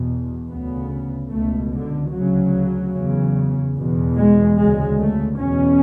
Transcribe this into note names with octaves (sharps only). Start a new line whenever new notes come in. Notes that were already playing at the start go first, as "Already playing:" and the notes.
Already playing: E2 B2
D2 C#3 B3
C#2 B2 A3
D3
D2 C#3 F#3
E2 C#3
E2 B2
G#3
D2 C#3 G#3
A3
E2 B2 C#4